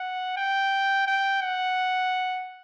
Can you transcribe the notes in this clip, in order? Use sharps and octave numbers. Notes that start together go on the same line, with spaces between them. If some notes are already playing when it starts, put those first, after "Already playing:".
Already playing: F#5
G5
G5
F#5